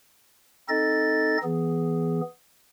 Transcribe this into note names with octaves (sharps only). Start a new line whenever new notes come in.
C4 D#4 A4 D#5 A6
E3 B3 G#4